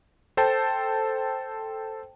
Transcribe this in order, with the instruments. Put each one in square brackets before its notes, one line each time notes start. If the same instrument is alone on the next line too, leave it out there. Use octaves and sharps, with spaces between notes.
[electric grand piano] A4 C5 G5 A5